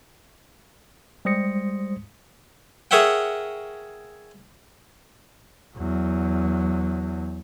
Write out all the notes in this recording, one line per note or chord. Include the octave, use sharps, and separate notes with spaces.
G3 G#3 C5 D#6 A#6 C#7
G#4 A#4 C#5 E5 F#5 G5
E2 F#3